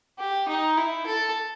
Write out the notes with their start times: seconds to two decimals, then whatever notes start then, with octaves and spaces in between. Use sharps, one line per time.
0.18 G4
0.48 D#4
0.77 E4
1.06 A4